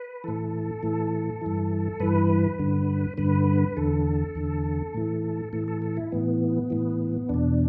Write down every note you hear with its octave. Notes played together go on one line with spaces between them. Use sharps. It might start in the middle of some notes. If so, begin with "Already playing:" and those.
Already playing: B4
A2 E3 A4
A2 E3
G2 E3
G2 E3 B4
G2 D3
G2 D3 B4
E2 D3 A4
E2 D3
A2 E3
A2 E3 A4
A4
A4
E4
A2 E3 B3
A2 E3
E2 B2 D4